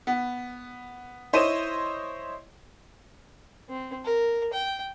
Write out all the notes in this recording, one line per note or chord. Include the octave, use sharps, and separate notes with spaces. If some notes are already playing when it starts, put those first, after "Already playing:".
B3
E4 C5 C#5 D#5 D#7 E7
C4
A#4
G5